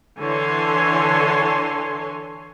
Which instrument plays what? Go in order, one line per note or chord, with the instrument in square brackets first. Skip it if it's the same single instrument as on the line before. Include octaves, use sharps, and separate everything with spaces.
[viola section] D3 E3 A4 C#5 G#5 C6